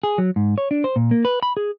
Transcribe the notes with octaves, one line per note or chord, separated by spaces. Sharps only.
G#4
F#3
G#2
C#5
D4
C5
A#2
A#3
B4
B5
G#4